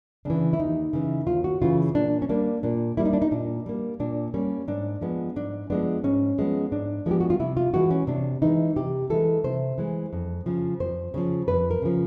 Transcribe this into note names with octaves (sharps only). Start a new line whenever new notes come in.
C#3 E3 D4
E4
D#2 D#4
C#3 E3
D#2 F4
F#4
C#3 E3 F4
A#2 D4
C#4
G3 A#3 D4
A#2 D4
G3 A#3 E4
D#4
D4
D#4
A#2 D4
G3 A#3
A#2 D4
G3 A#3 C#4
G#2 D4
F3 G#3 B3
G#2 D4
F3 G#3 B3 D4
G#2 C#4
F3 G#3 B3
G#2 D4
F3 G#3 B3 G4
F#4
F4
C3 E4
F4
E3 G#3 F#4
C#4
C3 D4
E3 G#3 D#4
C3 G4
E3 G#3 A4
C3 C5
E3 G#3
F2
C#3 F3
F2 C5
C#3 F3
F2 B4
A#4
C#3 F3